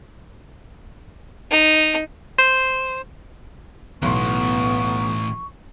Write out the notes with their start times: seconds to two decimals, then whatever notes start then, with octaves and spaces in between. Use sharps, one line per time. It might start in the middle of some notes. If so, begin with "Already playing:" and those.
1.51 D#4
2.38 C5
4.02 B1 A2 E3 B3 C6 C#6